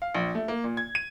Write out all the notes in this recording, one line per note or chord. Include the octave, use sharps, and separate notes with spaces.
F5
A#1
A3
A#3
A#2
G#6
D#7